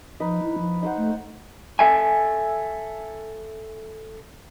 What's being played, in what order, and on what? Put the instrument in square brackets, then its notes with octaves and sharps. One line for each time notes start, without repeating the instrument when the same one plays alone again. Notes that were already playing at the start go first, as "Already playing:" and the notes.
[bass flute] F3 [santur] D#4 B4
[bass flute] E4
F3
[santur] D#4 C5 F#5
[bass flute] A3
[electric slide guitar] A4 E5 G#5